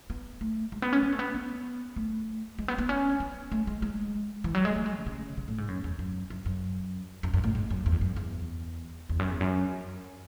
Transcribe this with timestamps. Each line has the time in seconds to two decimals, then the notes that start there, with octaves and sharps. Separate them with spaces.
0.10 B3
0.41 A3
0.72 G#3
0.82 B3
0.93 C#4
1.03 C#4
1.12 A3
1.19 B3
1.34 B3
1.96 A3
2.59 G#3
2.68 B3
2.78 B3
2.89 C#4
3.20 B3
3.52 A3
3.67 G#3
3.82 G#3
4.44 E3
4.55 F#3
4.65 G#3
4.76 A3
4.86 G#3
4.96 C#3
5.06 C#3
5.37 C#3
5.48 A2
5.58 G#2
5.68 F#2
5.84 E2
5.99 F#2
6.30 F#2
6.46 F#2
7.23 F#2
7.34 F#2
7.44 A2
7.55 G#2
7.70 F#2
7.86 E2
8.01 F#2
8.16 E2
9.09 E2
9.19 F#2
9.30 E2
9.41 F#2